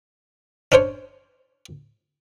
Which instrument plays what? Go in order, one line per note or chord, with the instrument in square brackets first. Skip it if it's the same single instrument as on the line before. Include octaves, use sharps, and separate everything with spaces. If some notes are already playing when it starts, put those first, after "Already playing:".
[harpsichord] C#4 D4 C5 C#5